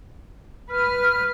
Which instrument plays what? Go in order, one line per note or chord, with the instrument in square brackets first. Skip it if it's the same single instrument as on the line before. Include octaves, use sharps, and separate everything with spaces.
[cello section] B4 [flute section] F6